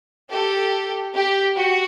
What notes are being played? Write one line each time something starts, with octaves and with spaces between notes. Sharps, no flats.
G4 A4
G4
F#4